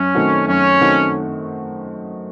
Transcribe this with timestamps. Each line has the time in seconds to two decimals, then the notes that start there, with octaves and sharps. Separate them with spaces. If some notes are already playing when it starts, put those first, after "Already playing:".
Already playing: F#2 C#4
0.15 D#3 A3 C4 F#4
0.48 F#2 C#4
0.81 D#3 A3 C4 F#4